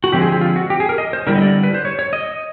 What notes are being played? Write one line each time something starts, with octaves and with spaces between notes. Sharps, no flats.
F#4
D3 F3 G#3 C4 G4
G#4
G4
F4
F#4
G4
G#4
A#4
D#5
C5
D3 G3 B3 E4 A#4
D#5
D5
B4
C5
C#5
C#5
D#5